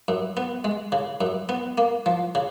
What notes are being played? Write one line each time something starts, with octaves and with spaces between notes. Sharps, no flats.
F#2
B3
G#3
C#3
F#2
B3
A#3
F3
C#3